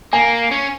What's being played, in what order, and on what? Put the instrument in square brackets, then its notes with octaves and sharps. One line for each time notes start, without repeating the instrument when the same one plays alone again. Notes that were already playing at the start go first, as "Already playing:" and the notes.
[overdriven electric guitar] A#3 [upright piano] G#5
[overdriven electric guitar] C#4